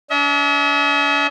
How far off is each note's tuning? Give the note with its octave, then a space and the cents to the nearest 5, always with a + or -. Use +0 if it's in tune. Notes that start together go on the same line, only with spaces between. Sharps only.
D4 -45 E5 -45